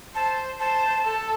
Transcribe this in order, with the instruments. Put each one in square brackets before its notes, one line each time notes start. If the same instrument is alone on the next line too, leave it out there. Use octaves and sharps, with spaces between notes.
[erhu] C5 [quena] A5
[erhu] C5 [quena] A5
[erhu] A4